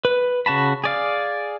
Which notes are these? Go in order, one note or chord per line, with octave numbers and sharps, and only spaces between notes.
B4
C#3 F#4 A5 B5
G#4 D5 F5